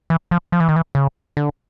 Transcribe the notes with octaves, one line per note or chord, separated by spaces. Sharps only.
E3
F3
F3
E3
D#3
E3
C#3
D3